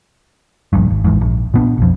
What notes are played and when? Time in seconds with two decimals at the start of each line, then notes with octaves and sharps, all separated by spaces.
0.73 D1 A#1 G2
0.90 G#1
1.04 A1 E2 G#2
1.21 A#1
1.54 A#2 B3 D4
1.78 B1 F2